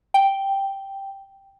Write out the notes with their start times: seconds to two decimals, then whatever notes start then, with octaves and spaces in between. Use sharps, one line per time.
0.14 G5